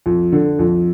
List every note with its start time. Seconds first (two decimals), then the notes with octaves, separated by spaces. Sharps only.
0.06 F2
0.32 D3
0.59 F2